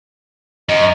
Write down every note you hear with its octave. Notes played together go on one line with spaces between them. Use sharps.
F#2 D#5